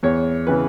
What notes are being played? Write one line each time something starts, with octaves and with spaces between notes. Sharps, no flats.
E2 C#5
C#3 E3 B4